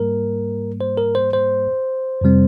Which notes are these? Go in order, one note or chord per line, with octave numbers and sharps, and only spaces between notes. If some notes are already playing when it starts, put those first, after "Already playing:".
Already playing: G#2 G3 A#3 A#4
C5
A#4
C5
C5
F2 C3 G3 C4